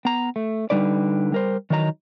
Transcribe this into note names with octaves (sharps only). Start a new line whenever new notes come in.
B3 A#5
A3
D3 G3 D#4 B4 D5
G3 A#4 C5
D#3 E3 F#3 D#4 D5 A#5